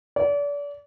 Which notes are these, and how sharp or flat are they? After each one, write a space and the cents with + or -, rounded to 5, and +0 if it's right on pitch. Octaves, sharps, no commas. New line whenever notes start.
D5 -35